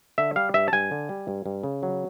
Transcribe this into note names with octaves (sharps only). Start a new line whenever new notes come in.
D3 E5
G3 F5
G2 E5
A5
G2 G#5
D3
G3
G2
G2
C#3
F#3